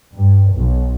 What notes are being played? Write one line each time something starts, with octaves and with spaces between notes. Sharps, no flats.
G2
B1